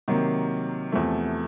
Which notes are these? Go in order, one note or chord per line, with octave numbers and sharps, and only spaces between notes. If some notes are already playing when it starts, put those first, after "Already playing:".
C3 D#3 F#3 A#3
E2 C3 F3 A3